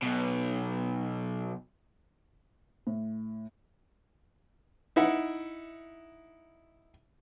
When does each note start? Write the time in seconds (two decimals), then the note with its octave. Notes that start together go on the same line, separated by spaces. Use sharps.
0.03 B1 B2
2.87 A2
4.96 D#4 E4 E5 F#5